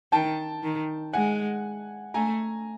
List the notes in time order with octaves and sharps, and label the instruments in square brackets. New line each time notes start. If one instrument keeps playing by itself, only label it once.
[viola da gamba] D#3 [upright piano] G5 A5
[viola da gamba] D#3
[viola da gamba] G#3 [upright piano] F#5 G#5
[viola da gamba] A3 [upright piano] G#5 A#5